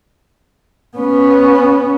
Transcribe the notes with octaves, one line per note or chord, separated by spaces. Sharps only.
B3 C#4